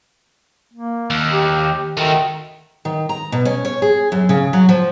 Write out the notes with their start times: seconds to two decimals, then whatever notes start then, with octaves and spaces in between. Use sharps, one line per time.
0.74 A#3
1.10 D#2
1.33 G4
1.97 D#3 A3 F#4
2.85 D#3
3.09 A#5
3.32 B2
3.45 C#4
3.65 C#5
3.82 G#4
4.12 F#2
4.29 C#3
4.53 F#3
4.69 F3